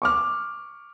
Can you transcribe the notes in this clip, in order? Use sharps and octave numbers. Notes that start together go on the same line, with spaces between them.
C#6 D6 F6